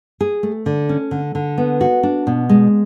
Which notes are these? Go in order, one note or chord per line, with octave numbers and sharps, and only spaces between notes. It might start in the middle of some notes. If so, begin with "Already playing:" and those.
G#4
A3
D3
C#4
D3
D3
B3
F#4
D4
B2
G#3